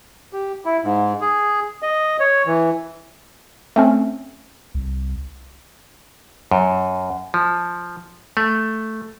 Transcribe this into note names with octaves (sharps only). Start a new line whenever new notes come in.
G4
E4
G#2
G#4
D#5
C#5
E3
A3 C4 C#4
C2
F#2
F3
A3